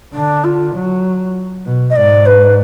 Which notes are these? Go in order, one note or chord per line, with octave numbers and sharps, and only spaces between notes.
D3 D4
F4
F#3
B2
D#5
G#2 D5
B4